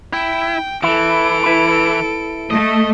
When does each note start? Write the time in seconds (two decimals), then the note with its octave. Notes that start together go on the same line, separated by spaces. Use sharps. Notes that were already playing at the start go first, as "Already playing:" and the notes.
0.13 E4 G5
0.83 E3 E4 A4 D7
1.44 E4 B4
2.51 A3 D#5